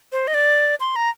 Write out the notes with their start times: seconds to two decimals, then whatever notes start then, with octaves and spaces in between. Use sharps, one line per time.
0.12 C5
0.27 D#5
0.34 D5
0.80 C6
0.96 A#5